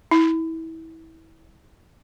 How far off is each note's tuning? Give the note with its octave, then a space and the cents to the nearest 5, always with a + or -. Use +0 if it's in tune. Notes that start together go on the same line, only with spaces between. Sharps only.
E4 -30